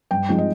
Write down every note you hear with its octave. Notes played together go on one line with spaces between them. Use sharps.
G2 G5
F3 G#3 C4 D#4
D#5